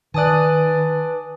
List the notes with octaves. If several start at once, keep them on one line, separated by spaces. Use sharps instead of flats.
D#3 B4 D5 G#5 A5 D#6 F#6